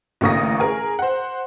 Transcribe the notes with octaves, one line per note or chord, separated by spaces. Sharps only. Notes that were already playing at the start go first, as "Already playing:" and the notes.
A1 D3 A#3 C#6 D#6 A#6
G#4 A#4
C5 F#5